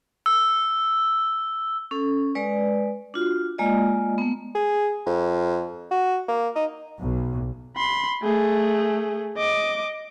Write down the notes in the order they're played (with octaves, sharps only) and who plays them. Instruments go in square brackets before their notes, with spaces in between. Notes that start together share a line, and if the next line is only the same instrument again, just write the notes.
[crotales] E6
[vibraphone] C#4 A4
G#3 B4 D5
D4 F4 F#4
G#3 A#3 F4 D5 D#5
A3 B3
[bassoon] G#4
F2
F#4
A#3
D#4
[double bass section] B1
[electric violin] B5 C6
A3 G#4
D#5 D6